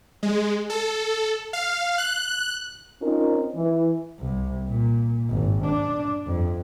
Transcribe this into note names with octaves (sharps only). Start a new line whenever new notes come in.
G#3
A4
F5
F#6
C4 C#4 D#4 F4 A#4
E3
C2
A#2
G#1
D4
F2